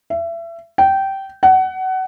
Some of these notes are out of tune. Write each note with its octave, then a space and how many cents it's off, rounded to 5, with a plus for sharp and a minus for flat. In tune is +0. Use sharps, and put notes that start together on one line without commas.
E5 +30
G5 -15
F#5 +25